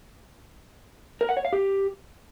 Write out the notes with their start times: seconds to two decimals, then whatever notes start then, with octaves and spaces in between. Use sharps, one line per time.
1.21 A#4
1.29 F#5
1.37 C#5
1.45 F5
1.53 G4